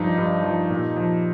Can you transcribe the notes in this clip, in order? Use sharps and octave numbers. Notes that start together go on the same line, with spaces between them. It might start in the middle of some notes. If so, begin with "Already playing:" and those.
Already playing: G2 F3 D#4 G4
G2
F3
A#2
F3